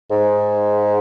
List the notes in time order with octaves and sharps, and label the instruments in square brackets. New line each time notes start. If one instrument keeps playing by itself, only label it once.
[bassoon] G#2